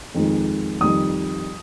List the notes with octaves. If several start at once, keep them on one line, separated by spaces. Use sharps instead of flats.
F2 D#3 G#3
F2 D#3 G3 D#6